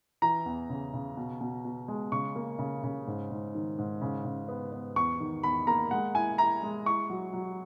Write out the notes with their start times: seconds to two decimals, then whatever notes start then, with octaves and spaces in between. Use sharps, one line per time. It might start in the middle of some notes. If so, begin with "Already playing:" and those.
0.22 E3 A#5
0.46 E2
0.70 C#3
0.94 C#3
1.17 B2
1.41 B2
1.65 B2
1.88 G#3
2.12 C#3 C#6
2.36 A#3
2.59 C#3
2.84 C#3
3.07 G#2
3.31 G#2
3.55 D#3
3.78 G#2
4.01 C#3
4.25 C#3
4.48 B3
4.72 B3
4.96 E2 C#6
5.20 D#3
5.43 E2 B5
5.67 A#3 A#5
5.91 G#3 F#5
6.15 E4 G#5
6.38 E4 A#5
6.63 G#3
6.86 E4 C#6
7.10 F#3
7.33 F#3